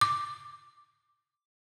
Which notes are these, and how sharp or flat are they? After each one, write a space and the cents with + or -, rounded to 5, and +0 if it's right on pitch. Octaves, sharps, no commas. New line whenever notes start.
D6 +5